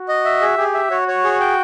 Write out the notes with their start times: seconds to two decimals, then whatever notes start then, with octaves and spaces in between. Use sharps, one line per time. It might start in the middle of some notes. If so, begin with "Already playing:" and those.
Already playing: F#4
0.08 D#5
0.25 E5
0.42 G#4
0.58 G4 G#4
0.74 E5
0.91 F#4 C#5
1.08 C#5
1.24 G#4
1.40 G5